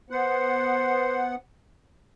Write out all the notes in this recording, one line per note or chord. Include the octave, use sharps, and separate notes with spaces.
B3 C5 F#5